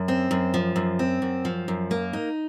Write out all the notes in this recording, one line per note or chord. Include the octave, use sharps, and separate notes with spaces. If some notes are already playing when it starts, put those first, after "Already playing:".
Already playing: F#2
C4
F#2
F3
F#2
C4
F#2
F3
F#2
A#3
D#4